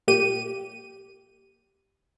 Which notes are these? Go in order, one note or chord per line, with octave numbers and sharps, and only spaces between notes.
A#2 G4 D#7